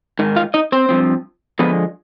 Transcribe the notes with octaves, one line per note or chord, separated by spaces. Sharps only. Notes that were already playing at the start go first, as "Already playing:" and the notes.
G#2 D#3
F4 F5
D#4 D#5
C4 C5
G2 F3 C4
D3 F3 G#3 B3 B4